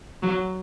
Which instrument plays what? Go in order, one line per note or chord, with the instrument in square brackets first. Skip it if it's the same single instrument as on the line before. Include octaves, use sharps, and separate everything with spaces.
[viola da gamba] F#3